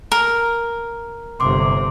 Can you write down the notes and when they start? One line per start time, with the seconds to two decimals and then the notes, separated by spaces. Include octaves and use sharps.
0.12 A#4
1.40 G1 C3 C6 D6